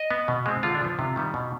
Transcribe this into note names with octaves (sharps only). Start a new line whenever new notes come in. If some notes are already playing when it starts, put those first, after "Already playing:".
Already playing: D#5
B3
B2
G#3 C4
D3 F4
D4
F3 B3
C3 F4
D#3 G3 B3
B2